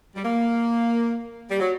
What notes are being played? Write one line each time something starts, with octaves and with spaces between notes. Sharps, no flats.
G3
A#3
G3
F#3